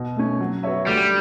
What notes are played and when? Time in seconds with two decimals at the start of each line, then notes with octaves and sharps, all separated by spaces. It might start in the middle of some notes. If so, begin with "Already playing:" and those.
Already playing: B2
0.16 A3 C#4
0.40 F#3
0.63 B3 F#4 C#5 E5
0.87 D2 G3